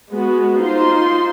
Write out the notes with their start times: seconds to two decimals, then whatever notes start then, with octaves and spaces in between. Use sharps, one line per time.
0.11 G#3 B3 F#4
0.61 D#4 F4 C5 C6